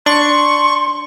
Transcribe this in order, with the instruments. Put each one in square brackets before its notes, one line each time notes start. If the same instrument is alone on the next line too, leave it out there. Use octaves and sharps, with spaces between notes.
[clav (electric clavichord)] D4 [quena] C6 [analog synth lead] C#6